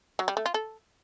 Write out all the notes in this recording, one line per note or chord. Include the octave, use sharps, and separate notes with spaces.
F#3
G3
A3
F4
A4